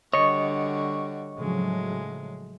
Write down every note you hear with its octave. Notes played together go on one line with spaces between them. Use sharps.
D3 G3 F#4 C#5 D#5 C#6
A2 C#3 F3 F#3 G#3